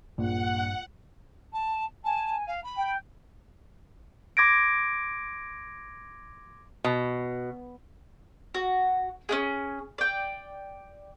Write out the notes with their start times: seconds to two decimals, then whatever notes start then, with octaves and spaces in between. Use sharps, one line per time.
0.18 A#1 G2 F#5
1.52 A5
2.04 G#5 A5
2.47 F5
2.63 B5
2.76 G5
4.37 C6 D6 G#6 A#6 D7
6.84 B2
8.54 F#4
9.29 C#4 D4 G#4
9.98 D5 G5